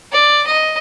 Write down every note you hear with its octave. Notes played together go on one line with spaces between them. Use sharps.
D5
D#5